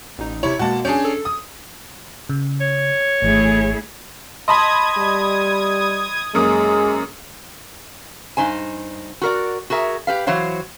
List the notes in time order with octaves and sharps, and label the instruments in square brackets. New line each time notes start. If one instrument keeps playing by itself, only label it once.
[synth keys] A1 D#4
[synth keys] C3 E4 [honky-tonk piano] C#5
[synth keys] B2 G#3 A#3 [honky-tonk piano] F#4 A5
[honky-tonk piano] C#4 D4 G#4 [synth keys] G6
[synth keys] A4
[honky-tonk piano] D#6
[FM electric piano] C#3
[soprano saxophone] C#5
[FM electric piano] G#1 E3 [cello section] A3 E4 G#4
[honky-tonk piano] D#5 A5 B5 [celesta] C6 [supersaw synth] D#6 G#6
[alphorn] G3
[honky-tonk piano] F#2 A#3 D#6 [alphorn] G#3
[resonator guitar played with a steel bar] G2 D#4 C5 G#5
F#4 A#4 D5
F#4 G#4 A#4 E5
G4 B4 F5
E3 F#3 C5 C#5 F5